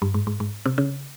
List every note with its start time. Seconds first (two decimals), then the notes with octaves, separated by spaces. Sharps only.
0.02 G2
0.14 G#2
0.27 G#2
0.40 G#2
0.66 C3
0.78 C#3